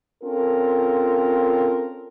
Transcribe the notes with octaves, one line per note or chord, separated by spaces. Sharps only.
C4 C#4 F4 A4 A#4